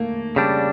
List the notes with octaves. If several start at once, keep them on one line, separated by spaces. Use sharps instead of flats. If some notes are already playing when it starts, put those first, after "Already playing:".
Already playing: A3 A#3
C#3 G3 D4